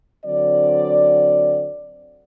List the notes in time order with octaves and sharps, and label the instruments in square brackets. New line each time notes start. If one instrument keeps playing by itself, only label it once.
[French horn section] D3 F#3 C4 D5